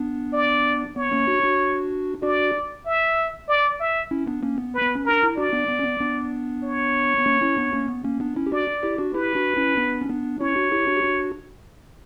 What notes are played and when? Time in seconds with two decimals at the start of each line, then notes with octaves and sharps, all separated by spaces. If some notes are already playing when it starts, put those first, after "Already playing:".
Already playing: B3 D4
0.33 D5
0.96 B3 C#5
1.12 A#3 C#4
1.27 D4 F#4
1.43 D4 F#4
2.22 D4 F#4 D5
2.86 E5
3.48 D5
3.80 E5
4.11 C#4 E4
4.27 B3 D4
4.43 A#3 C#4
4.58 B3
4.74 B4
4.82 B3
4.95 C#4
5.06 D4 A#4
5.23 E4
5.37 D4 F#4 D5
5.52 B3 D4
5.69 B3
5.79 C#4
5.84 B3
6.00 B3 D4
6.63 C#5
7.18 B3
7.26 A#3 C#4
7.42 C#4 E4
7.57 B3 D4
7.73 A#3 C#4
7.88 B3
8.04 A#3 C#4
8.20 B3 D4
8.36 C#4 E4
8.46 G4
8.52 D4 F#4 D5
8.83 E4 G4
8.98 D4 F#4
9.14 E4 G4 B4
9.35 D4 F#4
9.57 C#4 E4
9.77 B3 D4
10.02 C#4
10.09 B3 D4
10.41 C#4 E4 C#5
10.56 D4 F#4
10.72 E4 G4
10.87 D4 F#4
10.97 G4
11.03 D4 F#4